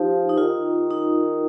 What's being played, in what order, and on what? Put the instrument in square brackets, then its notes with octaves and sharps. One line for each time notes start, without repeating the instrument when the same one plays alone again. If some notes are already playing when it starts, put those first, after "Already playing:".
Already playing: [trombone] F3 [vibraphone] D#4 G4
[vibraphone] D#4
[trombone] D#3 [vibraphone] F4
[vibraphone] D#4